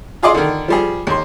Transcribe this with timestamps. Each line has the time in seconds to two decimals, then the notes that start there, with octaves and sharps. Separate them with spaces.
0.23 F4 G#4 D5 D#5 C6
0.34 D3 D#3
0.68 F3 G3 G#4
1.07 D#2 C6